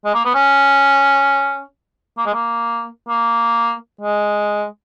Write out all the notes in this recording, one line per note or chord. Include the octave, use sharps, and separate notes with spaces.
G#3
A#3
B3
C#4
A#3
G#3
A#3
A#3
G#3